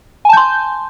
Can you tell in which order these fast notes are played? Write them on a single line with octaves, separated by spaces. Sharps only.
G#5 A5 G6 C6